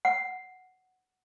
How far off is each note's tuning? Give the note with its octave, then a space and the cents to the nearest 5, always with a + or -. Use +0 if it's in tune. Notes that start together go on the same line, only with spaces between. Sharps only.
F#5 -5